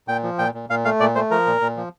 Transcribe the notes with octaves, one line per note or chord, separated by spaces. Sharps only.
A#2 G5
F3
A#2 G5
A#2
A#2 F5
A3 F5
A#2 D5
A3 C5
F3 A#4
A#2
A#2
F3